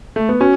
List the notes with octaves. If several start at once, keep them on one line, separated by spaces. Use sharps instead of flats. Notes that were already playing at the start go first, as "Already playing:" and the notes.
A3
B3
C#4 F#4